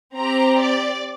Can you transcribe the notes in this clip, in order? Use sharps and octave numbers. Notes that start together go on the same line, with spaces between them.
C4 G4 A#5
D5